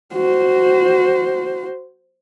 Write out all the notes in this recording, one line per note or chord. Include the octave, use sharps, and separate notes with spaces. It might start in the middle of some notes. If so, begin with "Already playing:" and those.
F#4 C5